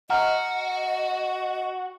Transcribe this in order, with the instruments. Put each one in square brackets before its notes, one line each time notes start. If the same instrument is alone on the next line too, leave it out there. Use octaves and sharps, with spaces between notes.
[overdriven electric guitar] F#4 [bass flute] D#5 [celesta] F#5 A#5 F6